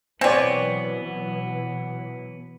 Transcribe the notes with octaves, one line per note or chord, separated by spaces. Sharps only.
B2 E3 F#3 B3 C4 C#5 D5 G#5